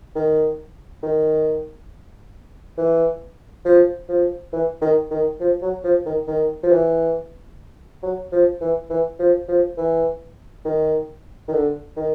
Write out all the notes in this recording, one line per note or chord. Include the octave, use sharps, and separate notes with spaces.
D#3
D#3
E3
F3
F3
E3
D#3
D#3
F3
F#3
F3
D#3
D#3
F3
E3
F#3
F3
E3
E3
F3
F3
E3
D#3
D#3
D3
D#3